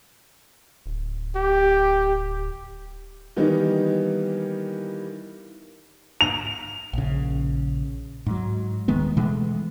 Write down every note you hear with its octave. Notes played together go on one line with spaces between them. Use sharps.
D1
G4
D#3 E3 G3 A#3 B3 D#4
F7
A#1 C#3
G#2 F#3
D#1 D#3 G#3 B3
B2 E3 G#3 A3